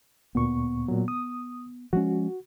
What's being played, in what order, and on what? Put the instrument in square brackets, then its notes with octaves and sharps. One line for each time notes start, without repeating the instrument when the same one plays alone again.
[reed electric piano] D2 A#2 C#6 [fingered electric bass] B3
[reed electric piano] A#2 F#3
D#6
[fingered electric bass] F3 G#3 C#4 [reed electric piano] F#4